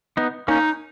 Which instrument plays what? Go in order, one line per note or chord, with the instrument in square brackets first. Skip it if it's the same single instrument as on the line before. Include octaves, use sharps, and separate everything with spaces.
[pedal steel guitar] B3 D#4
[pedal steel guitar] A#3 C#4 [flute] D#4